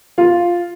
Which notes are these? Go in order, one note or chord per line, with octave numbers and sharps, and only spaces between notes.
F4